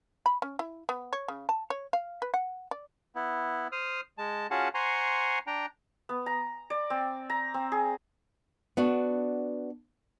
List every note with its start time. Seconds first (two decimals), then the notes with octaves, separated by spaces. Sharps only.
0.26 B5
0.42 C#4
0.59 E4
0.89 B3
1.13 C#5
1.28 C#3
1.49 A5
1.70 C#5
1.93 F5
2.22 B4
2.34 F#5
2.71 D5
3.16 B3 E4
3.72 C5 D#6 F6
4.18 G#3 A5
4.51 C#4 F4 F#4 G#4 F#5 A5
4.74 C5 F#5 G#5 A#5 C6 C#6
5.47 D4 G5 A#5
6.09 B3
6.26 A#5
6.70 D5
6.90 C4
7.30 A#5
7.54 C4
7.72 G#4
8.77 B3 D4 F#4